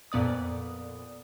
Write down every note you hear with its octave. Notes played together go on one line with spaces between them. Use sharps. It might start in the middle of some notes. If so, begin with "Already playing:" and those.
F2 A#2 B3 D5 D#6